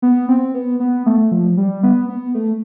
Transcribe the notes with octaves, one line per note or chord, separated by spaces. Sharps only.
B3
C4
B3
B3
A3
F3
G3
B3
B3
A3